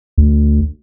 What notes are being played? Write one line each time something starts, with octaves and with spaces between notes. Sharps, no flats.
D2